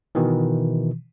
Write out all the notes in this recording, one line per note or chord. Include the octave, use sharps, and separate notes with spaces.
B2 D#3 E3